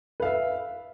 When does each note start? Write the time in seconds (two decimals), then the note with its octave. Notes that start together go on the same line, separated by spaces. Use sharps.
0.20 B4
0.22 F5
0.25 E5